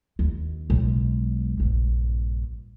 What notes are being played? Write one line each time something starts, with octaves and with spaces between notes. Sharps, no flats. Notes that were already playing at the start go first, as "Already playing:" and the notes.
D#2
B1 G#3
A#1 G2